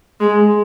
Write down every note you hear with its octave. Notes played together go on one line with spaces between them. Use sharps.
G#3